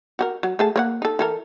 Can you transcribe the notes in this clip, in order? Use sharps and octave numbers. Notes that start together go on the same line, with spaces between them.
F#4 G4 A#4
F#3
A3 G#4 A5
A#3 C#5 F#5
D#4 A4
E3 A4 A#4